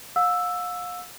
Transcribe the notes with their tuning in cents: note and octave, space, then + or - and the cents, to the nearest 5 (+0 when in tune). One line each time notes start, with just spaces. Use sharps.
F5 +40 E6 +0